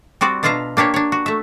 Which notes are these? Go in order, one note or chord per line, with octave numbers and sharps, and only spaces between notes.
G3 C4 F#4 D5
B2 D4 F4 E5 F5 A#5
A#3 D4 G4 C#5
D4 C#5
F#4
A3 E5